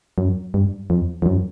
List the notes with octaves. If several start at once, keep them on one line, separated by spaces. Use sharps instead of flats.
F#2
G2
F2
F2
F#2